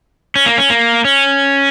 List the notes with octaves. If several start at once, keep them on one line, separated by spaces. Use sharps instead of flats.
C#4
A#3
C#4
A#3
C#4